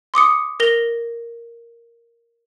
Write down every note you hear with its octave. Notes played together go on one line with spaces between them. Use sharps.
C6 D6 D#6 C#7
A#4 A#6 F7 G7